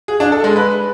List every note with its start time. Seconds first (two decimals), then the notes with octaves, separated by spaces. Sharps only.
0.08 G#4
0.20 D4
0.32 A4
0.44 G#3
0.56 B4